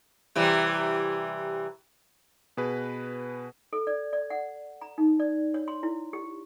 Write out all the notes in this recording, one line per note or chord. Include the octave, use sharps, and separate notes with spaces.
C3 E3 G3
B2 G#4 B4
A4
D5
D5
F#5
A#5
D#4
D5
C#5
C6
E4
G4